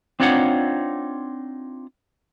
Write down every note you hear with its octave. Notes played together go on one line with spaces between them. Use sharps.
C4 D4 D#4 F4 C#5 F#5